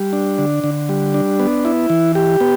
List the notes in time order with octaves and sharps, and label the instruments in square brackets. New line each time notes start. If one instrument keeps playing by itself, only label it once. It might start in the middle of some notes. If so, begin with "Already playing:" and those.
Already playing: [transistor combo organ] G3
D4
D3
D3
G3
D4
B3
E4
E3
G4
B3